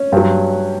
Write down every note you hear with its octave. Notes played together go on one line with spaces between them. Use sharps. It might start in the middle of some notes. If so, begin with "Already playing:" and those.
Already playing: C#4
G2 F#3